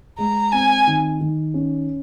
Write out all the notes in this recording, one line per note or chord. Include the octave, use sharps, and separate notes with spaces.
G#3 A#5
C4 G#5
D#3
D#3
C#4